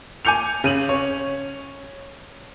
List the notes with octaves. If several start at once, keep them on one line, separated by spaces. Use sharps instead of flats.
G#5 D6 G6 C#7 F7
C#3 D#7 F#7
C#4 C#5